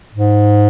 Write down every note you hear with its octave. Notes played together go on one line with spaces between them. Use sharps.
G#2